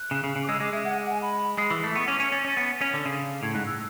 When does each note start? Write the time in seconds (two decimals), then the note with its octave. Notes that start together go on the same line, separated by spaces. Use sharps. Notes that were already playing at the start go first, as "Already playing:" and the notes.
Already playing: F#6
0.11 C#3
0.24 C#3
0.36 C#3
0.43 D6
0.48 G#3 E6
0.60 G#3 D6
0.72 G#3 E5
0.85 F#5
0.97 F#5
1.09 G#5
1.22 B5
1.58 G#3
1.71 E3
1.83 A3
1.95 B3 C#6
2.07 C#4 D6
2.20 C#4 G#6
2.32 C#4 A6
2.45 C#4 A6
2.57 B3
2.81 C#4
2.94 D3
3.06 C#3
3.43 A2 G#6
3.54 G#2 F#6
3.66 E6